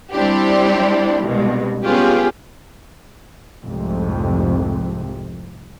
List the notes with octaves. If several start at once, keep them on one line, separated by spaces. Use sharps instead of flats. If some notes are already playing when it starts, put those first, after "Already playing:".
G3 C4 D4 E4 G4
C2 G2 B2 G#3
B3 C#4 F4 G4 G#4 B4
F1 C2 F2 G#2 C3